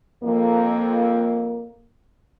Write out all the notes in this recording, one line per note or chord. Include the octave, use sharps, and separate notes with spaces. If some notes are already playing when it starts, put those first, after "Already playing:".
F2 A#3